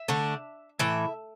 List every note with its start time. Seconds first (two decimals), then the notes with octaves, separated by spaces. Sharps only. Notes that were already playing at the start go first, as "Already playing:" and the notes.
Already playing: E5
0.08 D3 A3 D4
0.79 A2 E3 E5